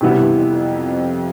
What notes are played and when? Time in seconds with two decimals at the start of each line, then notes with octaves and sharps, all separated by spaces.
0.01 F#2 C3 E3 G3 B3 E4
0.17 G2
0.32 F2
0.46 F2